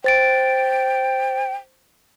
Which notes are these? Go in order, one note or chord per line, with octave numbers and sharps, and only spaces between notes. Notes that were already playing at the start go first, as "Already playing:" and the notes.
C5 G5 A6 D7